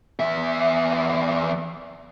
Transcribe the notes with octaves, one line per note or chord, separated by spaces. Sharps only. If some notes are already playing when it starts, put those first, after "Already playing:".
E2 E5